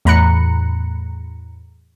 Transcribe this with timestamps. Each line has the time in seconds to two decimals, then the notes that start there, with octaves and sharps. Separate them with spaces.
0.05 E2 A2 A#5 B5 F#6 C#7